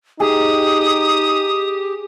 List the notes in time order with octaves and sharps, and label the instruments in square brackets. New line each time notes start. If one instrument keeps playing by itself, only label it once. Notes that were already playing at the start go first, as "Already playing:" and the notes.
[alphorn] D#4 [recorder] G4 [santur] G#4 [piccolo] D#6